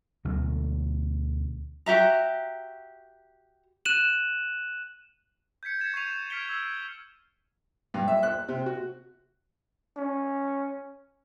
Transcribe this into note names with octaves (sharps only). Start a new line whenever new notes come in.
D2 B2 F#3
F#4 G4 E5 A#5
F#6 D#7 E7 F#7
G6 G#6 B6 C#7
G#6 A6 B6 E7
C#6 G6 G#6 C7 D#7 F7
F6 G#6 B6 C#7 D7 G7
E6 G#6 C7
G2
E5
F#6
C3
F#4
C#4